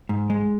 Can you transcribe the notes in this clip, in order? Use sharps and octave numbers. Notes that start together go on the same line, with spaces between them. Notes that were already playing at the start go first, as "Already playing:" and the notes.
G#2
G#3